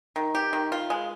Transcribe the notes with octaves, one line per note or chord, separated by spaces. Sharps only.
D#3
G4
D#3
F4
G#3